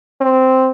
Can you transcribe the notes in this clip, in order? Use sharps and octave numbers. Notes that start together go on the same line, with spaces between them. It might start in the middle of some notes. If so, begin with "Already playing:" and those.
C4